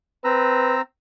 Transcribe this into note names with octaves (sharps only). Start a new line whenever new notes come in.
C4 B4 A#5 E6